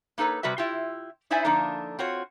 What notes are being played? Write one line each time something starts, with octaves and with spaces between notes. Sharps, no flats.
A#3 D#4 A4 B4 C#5
C3 G3 F#4 B4 E5
E4 F4 G4
D#4 E4 C5 D5 E5 G#5
D3 F3 A#3 D4 D#4
C4 F4 F#4 C#5